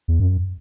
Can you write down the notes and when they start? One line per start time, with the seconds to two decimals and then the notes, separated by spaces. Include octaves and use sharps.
0.08 E2
0.20 F#2